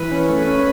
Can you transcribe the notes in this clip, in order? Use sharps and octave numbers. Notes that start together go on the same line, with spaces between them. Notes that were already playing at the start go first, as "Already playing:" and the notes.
Already playing: E3 B4
C#4
A3
C#4